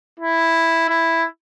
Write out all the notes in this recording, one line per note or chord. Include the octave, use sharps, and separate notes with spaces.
E4
E4